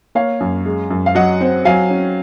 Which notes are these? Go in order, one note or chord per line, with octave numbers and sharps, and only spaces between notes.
A#3 C#5 F5
F#2
G#3
F#2
F5
F#3 D#5 F#5
C4
F#3 F5 G#5
C#4